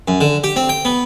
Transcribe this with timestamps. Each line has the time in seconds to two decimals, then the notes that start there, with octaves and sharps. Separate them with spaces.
0.08 F#2
0.21 D3
0.44 G4
0.56 C4
0.69 G5
0.85 B3